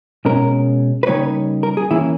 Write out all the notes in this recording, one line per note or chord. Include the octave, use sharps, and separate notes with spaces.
B2 G#3 C#4 A#4
B4
C#3 G3 A#3 D#4 C#5
A#4
G#4
E3 A#3 C#4 E4